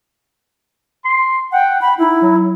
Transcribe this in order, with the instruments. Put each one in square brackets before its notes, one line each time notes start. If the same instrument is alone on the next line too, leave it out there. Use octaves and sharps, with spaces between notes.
[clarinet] C6
[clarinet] F#5 [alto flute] G5
[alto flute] B5
[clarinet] D#4 [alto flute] E4
[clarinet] F#3